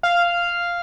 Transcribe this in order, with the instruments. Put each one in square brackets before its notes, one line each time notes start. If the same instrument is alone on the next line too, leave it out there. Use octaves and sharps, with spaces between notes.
[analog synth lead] F5